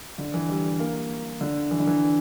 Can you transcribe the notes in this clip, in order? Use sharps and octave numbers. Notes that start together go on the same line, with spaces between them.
D3
E3
G3
A#3
D3
E3
D3
E3